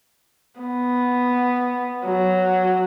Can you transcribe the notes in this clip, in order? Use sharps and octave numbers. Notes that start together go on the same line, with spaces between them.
B3
F#3